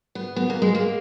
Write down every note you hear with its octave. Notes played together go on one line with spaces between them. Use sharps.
B3
B3
A#3
G#3
A#3